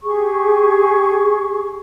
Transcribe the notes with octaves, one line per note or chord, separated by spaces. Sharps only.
G4 G#4 C#6